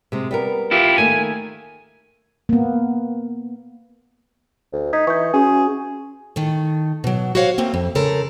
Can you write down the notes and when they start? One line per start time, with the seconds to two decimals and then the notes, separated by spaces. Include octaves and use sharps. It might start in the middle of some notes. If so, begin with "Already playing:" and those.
0.12 C3 G#3
0.31 G3 B3 A#4
0.71 E4 F4 G4
0.98 D#3 A3 A#3 G#5
2.49 A#3 B3
4.72 D2
4.93 D#4 D#6 G#6 B6
5.07 E3 C#6 G6
5.34 C#4 F#4 G#4 C#6
6.36 D#3 A3
7.04 B2 F#3
7.35 F#4 G4 C5 C#5 F5 F#5
7.58 A3 A#3 C4
7.74 F2
7.95 C#3 G#3 A4 A#4